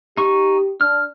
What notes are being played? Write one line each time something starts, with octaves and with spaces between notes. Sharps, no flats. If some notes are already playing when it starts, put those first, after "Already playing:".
D#4 G4 C#6
D4 F6